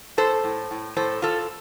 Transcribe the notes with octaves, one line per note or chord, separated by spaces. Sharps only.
A2 A4 C5
A2
A2
A2 A4 C5
A2 F4 A4